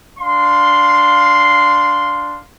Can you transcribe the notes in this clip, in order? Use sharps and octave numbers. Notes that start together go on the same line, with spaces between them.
D4 F5 C6